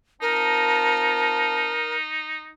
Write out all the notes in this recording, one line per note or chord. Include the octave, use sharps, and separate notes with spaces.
C4 D#4 F4 A#4 A5